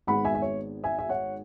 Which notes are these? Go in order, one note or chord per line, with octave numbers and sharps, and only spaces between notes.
G#1 G#2 G#3 B3 F#5 B5
E5 G#5
E5
C#5
E5 G#5
E5
C#5 F#5